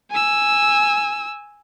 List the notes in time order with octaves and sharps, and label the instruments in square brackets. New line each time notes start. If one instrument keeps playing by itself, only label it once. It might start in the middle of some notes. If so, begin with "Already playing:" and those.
[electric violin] G#5 E6